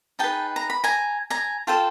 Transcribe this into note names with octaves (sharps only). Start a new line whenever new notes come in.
D#4 G#4 B4 G5 A5
A#5
B5
G#5 A#5
G#5 A#5
F4 A4 C5 G5 A5